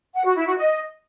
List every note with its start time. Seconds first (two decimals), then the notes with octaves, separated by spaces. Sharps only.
0.14 F#5
0.25 F#4
0.36 E4
0.47 F#4
0.57 D#5